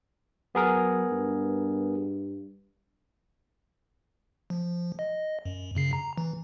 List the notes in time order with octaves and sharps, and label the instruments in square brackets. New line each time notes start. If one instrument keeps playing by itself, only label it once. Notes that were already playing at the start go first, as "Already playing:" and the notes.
[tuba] F#3 [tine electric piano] B3 G#4 A#4
[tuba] G2
[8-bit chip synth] F3
D#5
F#2
F#2 C#3 C7
A#5
E3